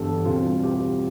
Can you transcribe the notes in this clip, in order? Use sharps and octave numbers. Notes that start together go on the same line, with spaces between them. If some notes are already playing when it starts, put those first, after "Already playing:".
Already playing: G2 E3 B3 D4 G4 A4
E2 B2 G3 C4 F4
G4